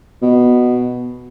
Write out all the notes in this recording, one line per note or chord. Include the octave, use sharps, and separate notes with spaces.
B2